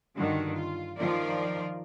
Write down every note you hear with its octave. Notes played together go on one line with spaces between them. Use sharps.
G2 D3 D#3 F#4
F4
D#3 F3 F4 A#4 D5